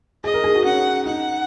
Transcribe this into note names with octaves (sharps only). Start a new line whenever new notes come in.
G#4 D#5
A#4
G#4
F#4
C#4 F#5
D#4 F#5